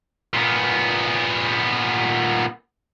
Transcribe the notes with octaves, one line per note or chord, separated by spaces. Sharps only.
A#2 B3